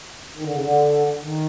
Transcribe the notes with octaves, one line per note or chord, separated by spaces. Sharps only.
D#3
D3
C#3
D3
D#3